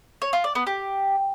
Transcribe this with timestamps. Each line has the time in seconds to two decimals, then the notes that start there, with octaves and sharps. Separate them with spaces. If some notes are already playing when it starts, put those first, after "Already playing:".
0.22 C#5
0.33 F4
0.44 D5
0.55 B3
0.67 G4